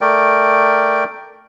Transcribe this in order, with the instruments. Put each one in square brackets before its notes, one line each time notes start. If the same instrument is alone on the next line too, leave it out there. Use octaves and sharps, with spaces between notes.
[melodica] A3 A#4 D5 G5